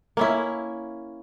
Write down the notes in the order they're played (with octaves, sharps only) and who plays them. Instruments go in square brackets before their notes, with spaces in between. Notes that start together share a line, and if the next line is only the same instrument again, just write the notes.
[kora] A#3 C#4 E4